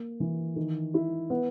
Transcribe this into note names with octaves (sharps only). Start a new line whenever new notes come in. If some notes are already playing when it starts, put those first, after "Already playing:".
Already playing: A#3
E3
D#3
E4
B3